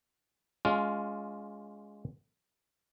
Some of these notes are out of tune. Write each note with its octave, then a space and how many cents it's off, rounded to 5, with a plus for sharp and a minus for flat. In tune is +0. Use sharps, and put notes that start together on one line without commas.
G#3 +0 C#4 +30 F4 +5